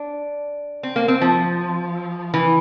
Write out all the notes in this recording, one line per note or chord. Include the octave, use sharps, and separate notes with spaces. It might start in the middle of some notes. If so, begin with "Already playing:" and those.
Already playing: D4
C4
A#3
C4
F3
E3